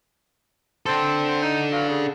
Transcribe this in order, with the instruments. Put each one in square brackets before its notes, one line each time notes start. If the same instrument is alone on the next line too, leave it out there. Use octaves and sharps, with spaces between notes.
[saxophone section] C4 [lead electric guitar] D4 A4
[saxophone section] D#4
E3 F#3 F4
C#3